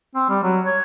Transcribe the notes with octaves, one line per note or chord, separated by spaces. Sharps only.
C4
G3
F#3
C#5